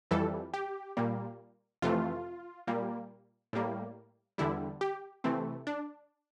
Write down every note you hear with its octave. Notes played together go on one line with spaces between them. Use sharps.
F2 E3 G3 A4
G4
A#2 G3 A#3
F2 C3 E3 A3 F4
A#2 G3 A#3
A2 G3 A#3
E2 D3 G3 E4
G4
C3 E3 A3 C4
D4